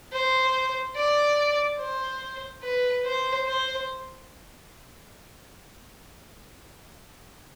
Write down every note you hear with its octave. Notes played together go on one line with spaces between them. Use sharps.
C5
D5
C5
B4
C5
C5